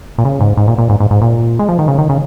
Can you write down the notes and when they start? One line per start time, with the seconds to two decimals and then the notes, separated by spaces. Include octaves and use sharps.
0.18 A#2
0.25 C#3
0.41 G#2
0.57 G#2
0.68 A#2
0.78 A#2
0.89 G#2
1.00 G#2
1.11 G#2
1.22 A#2
1.59 G#3
1.68 F3
1.79 D#3
1.88 C#3
1.98 D#3
2.09 C#3